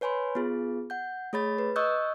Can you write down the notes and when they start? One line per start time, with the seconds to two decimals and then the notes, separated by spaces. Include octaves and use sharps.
0.01 B4 C#5 G#5 B5 C6
0.35 B3 F4 G#4
0.90 F#5 G6
1.33 A3 G#4 C#5 B5 A6
1.59 B4
1.76 D#5 C#6 D#6 E6 F#6 G6